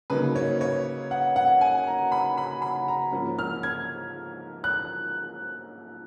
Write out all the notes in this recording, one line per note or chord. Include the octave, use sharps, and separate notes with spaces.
C#3 F#3 A#3 D#4 B4
C#5
C#5
F#5
F#5
G#5
A#5
B5
B5
B5
A#5
G#2 F3 A#3 C#4
F6
G#6
F#6